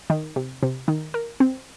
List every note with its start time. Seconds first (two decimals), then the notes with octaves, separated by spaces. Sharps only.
0.10 D#3
0.36 C3
0.63 C3
0.88 D#3
1.14 A#4
1.40 C4